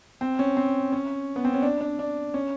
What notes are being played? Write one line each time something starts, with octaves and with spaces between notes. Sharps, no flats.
C4
C#4
C4
C#4
B3
C4
C#4
D4
D4
D4
C#4